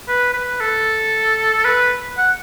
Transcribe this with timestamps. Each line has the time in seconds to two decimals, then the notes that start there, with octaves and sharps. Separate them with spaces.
0.09 B4
0.34 B4
0.61 A4
1.65 B4
2.18 F#5